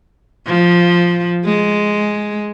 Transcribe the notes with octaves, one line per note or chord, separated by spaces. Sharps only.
F3
G#3